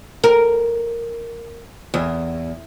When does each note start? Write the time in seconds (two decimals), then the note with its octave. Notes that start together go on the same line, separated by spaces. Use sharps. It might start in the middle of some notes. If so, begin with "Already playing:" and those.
0.24 A#4
1.94 E2